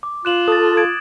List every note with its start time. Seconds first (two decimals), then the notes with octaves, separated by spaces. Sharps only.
0.03 D6
0.25 F4 F#6 E7 F#7
0.48 A4 D#6 A6
0.77 G#6 D7